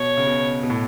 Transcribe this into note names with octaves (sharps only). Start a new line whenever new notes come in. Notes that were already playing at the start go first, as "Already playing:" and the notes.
Already playing: B2 C#5
C#3
B2
B2
A2